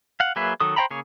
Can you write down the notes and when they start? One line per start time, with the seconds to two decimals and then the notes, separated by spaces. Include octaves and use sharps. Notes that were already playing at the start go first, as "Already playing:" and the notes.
0.20 F5 F#5
0.36 F#3 A#3 G#4 B4 E5
0.60 D#3 F#3 A4 D#6
0.76 C5 D#5 G5 A#5 B5
0.91 C#3 A#3 G#4 C#5